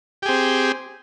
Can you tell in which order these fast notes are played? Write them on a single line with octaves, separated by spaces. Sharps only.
G4 G#4 C4